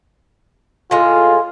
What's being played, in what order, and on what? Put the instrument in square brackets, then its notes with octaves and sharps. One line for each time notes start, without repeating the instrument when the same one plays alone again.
[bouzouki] A2 G#3 [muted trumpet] F4